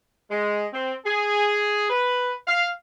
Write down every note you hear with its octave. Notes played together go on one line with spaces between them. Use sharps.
G#3
C4
G#4
B4
F5